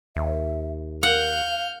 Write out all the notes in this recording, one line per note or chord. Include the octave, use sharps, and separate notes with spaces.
D#2 E5
F5 F#5 F6 G6